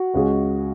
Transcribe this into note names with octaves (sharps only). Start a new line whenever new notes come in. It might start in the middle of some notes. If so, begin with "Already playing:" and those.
Already playing: F#4
C#2 C#3 G#3 C#4 G#4